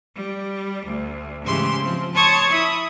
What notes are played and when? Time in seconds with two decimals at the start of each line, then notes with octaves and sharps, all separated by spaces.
0.15 G3
0.85 D2
1.44 G#2 C#3 E3 G4 C6
1.83 F3 C4
2.15 C#5 A5 C6 C#6 D#6 G#6
2.51 E4 B5 D#6